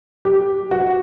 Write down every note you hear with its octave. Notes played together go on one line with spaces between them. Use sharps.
G4
F#4